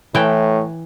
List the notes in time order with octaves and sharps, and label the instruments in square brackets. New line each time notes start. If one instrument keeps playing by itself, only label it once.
[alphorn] A2 [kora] E3 G5